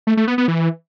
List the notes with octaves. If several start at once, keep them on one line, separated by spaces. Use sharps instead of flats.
A3
A3
B3
B3
E3